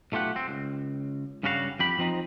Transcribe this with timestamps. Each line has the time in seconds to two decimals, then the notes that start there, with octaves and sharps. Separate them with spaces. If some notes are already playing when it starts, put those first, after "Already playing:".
0.12 B1 A3 F4 G4 F#5
0.36 C4
0.48 C#2
1.43 G2 C#3 G3 F#4 A#4 F5
1.79 F2 G4 B5
1.99 F3 C4 D#4